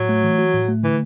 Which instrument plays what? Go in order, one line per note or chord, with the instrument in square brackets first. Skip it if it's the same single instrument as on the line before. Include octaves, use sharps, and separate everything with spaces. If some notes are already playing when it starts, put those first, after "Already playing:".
Already playing: [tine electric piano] A2 [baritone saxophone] F#3
[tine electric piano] A3
E3
F#4
A2
A3
[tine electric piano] D3 [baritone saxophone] E3